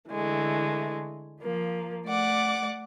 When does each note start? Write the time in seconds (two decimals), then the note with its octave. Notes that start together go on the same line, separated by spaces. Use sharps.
0.10 D3 E3 G#3 A3
1.41 F3 A#3
2.07 A3 D5 F#5 D6